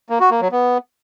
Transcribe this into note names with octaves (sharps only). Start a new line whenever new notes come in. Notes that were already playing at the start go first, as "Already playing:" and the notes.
A#3
F#4
A#3
F#3
B3